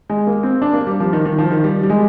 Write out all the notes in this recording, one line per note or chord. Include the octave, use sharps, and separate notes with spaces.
G#3
A#3
C4
D4
A#3
G3
F3
D#3
D#3
F3
D#3
G3
G3
G#3